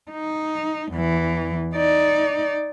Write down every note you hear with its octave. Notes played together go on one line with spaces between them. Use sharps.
D#4
E2 E3
D#4 D5